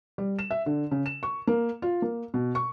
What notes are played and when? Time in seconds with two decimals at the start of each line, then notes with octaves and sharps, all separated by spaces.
0.18 G3
0.39 E7
0.51 E5
0.66 D3
0.91 C#3
1.06 E7
1.23 C#6
1.47 A#3
1.82 F4
2.02 A#3
2.34 B2
2.55 C#6